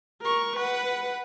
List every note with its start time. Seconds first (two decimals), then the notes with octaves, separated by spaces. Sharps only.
0.21 A#4 C#6
0.57 B4 F#5